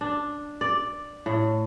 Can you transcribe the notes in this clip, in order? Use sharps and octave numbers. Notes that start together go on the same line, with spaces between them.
D4
D5
A2